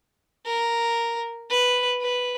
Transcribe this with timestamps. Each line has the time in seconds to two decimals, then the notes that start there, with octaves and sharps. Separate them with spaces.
0.46 A#4
1.50 B4
2.01 B4